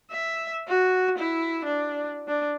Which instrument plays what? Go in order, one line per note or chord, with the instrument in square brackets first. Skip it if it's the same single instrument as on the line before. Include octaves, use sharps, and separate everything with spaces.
[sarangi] E5
F#4
E4
D4
D4